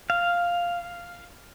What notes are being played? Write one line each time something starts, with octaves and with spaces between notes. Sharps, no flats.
F5